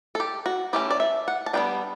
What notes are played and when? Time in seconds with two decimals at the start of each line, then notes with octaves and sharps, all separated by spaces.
0.15 A4
0.20 G4
0.46 F#4
0.73 E3 A3 C#4 G4
0.91 D5
1.00 E5
1.28 F#5
1.46 A5
1.53 G3 B3 D4 G5